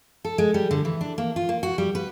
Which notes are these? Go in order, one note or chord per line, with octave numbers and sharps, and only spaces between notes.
A4
G#3
G3
D3
E3
D4
A#3
F4
A#3
F#4
G3
B4